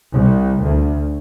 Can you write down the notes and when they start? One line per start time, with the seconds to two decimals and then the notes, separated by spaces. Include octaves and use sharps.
0.13 C2
0.62 D2